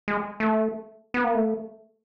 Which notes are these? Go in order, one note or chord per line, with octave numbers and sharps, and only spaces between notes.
G#3
A3
B3
A#3
A3